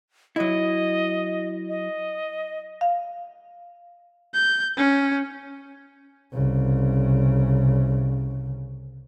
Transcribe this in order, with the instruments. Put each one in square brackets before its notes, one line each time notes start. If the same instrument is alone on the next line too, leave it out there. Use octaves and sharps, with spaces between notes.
[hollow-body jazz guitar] F#3 E4 [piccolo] D#5
[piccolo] D#5
[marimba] F5
[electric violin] G6
C#4
[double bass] C2 C#3